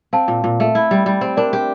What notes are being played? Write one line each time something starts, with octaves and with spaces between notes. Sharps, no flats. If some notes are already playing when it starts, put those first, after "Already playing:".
C4 F5 A5
A#2
A#2
A3
E4
G3
G3
C4
D4 A#4 D5
G4